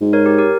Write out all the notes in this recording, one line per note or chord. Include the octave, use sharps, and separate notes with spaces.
G#2
A#4 C#5
G4 A#4
G4 A#4